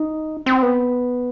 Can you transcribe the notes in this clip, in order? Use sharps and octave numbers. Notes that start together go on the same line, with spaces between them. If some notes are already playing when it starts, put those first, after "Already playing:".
Already playing: D#4
C4
B3